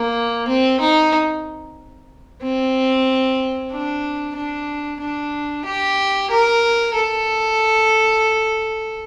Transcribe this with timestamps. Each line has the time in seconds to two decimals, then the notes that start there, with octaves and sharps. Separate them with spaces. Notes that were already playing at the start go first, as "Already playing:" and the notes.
Already playing: A#3
0.48 C4
0.80 D#4
2.42 C4
3.71 D4
4.36 D4
5.01 D4
5.65 G4
6.31 A#4
6.95 A4